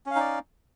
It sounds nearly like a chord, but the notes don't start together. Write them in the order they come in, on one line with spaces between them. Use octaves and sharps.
C#4 F5 D#4 D5